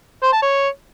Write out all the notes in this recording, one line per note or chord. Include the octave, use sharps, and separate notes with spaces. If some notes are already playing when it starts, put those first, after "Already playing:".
C5
A5
C#5